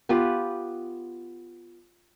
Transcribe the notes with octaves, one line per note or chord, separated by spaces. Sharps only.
B3 F4 G4 B4